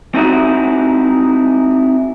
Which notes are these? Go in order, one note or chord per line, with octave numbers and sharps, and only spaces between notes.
C4 D#4 E4 F#4